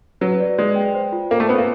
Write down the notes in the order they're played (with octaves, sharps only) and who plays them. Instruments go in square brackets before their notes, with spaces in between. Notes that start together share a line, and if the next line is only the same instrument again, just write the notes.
[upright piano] F#3 [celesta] B4
[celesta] D5
[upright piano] G#3 [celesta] D5
[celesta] G5
C5
F4
[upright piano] A#3 [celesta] C5
[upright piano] A3
[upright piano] B3 [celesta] C5
[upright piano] A#3